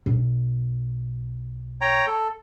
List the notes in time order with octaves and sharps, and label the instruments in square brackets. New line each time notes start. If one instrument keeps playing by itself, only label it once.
[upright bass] B1
[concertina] C#5 G5 A#5
A4